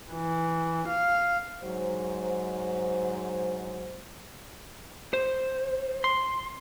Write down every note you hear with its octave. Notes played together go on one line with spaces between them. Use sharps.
E3
F5
G#2 F#3 C5
C5
C6